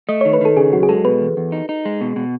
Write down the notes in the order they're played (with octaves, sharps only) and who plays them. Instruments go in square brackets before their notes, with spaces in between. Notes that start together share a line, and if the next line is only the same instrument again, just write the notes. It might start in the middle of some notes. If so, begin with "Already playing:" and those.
[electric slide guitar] A3 [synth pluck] D#5
[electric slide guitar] D#3 [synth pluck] C#5
[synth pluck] B4
[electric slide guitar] D#3 [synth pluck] A4
[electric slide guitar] C#3 [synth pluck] G#4
[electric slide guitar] F#2 [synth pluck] F#4
[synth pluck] G#4
[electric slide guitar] G#3 [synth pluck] A4
[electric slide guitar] B2 [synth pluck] B4
[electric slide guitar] E2
E2
D#4
D#4
G#3
B2
B2